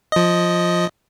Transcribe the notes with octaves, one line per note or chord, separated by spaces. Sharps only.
F3 D#5